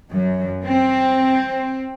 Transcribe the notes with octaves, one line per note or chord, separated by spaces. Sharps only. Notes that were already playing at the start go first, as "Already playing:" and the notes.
F#2
C4